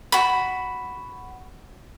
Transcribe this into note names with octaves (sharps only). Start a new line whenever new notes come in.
F#4 B5